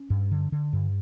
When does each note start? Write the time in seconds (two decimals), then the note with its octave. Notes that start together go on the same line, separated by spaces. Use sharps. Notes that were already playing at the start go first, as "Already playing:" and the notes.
Already playing: C#4
0.10 G2
0.31 D3
0.52 D3
0.73 G2